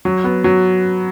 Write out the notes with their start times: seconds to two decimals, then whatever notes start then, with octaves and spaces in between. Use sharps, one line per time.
0.05 F#3
0.24 B3
0.44 F#3